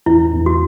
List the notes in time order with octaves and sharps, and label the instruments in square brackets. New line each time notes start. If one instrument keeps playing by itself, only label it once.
[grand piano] E2 [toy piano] E4
[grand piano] E2
[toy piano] F#4